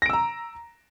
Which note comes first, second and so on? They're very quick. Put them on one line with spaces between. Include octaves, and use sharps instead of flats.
A#6 D7 E6 A#5